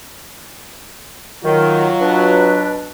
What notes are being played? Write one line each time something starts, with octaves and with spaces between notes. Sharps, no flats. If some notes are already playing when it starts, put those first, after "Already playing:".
D#3 F#3 F4
B2 D4 B4